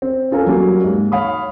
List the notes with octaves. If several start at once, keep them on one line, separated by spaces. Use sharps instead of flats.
C4
C#4 F4 A4 A#4 G#5
F#3 G3 A#3
G#2
C#5 F5 B5 D#6